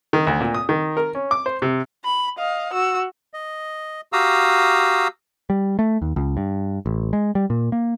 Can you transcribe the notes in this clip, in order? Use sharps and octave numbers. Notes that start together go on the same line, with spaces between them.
D#3
D2
A#2
D#6
D#3
A#4
C#4
D6
C5
C3
B5
D#5 F5
F#4 E6
D#5
F#4 G4 F5 A#5 D#6 E6
G3
A3
D#2
C#2
G2
A1
G#3
G3
A#2
A#3